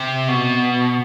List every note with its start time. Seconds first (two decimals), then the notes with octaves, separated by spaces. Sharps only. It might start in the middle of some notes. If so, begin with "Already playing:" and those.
Already playing: C3
0.28 B2